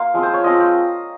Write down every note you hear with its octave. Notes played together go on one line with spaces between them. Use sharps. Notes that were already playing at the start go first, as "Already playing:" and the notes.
Already playing: A#3 F5 C6
F3 G#3 C4 F4
C5
C#5
F3 G#3 C4 F4 D#5
G5